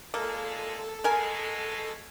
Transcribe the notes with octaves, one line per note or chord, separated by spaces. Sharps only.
A#2 G#3 A#3 A4
B2 G#3 A#4 G#5